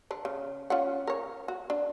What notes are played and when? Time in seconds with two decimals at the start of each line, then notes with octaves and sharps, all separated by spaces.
0.11 D3 D4
0.25 C#3
0.70 C#4 F4 F#5
1.07 A#4 C#5
1.48 F#4
1.70 D4